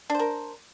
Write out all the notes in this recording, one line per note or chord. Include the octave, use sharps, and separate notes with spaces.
D4 A#4 C5